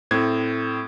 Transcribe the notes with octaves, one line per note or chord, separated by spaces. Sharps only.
A2 C4 G#6